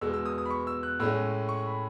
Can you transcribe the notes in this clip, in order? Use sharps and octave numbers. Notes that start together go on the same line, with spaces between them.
E2 B2 G#3 E6
E6
D#6
D#6
B5
C#6
E6
F#6
A2 G#3 C#4 E6
C#6
B5